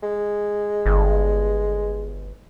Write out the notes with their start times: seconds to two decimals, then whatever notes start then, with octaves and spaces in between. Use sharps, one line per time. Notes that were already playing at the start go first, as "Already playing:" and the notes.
0.03 G#3
0.86 G1